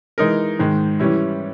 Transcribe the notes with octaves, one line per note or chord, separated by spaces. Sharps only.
E3 G#3 D#4 A#4
G#2 D#3 G#3
E3 G3 C#4 E4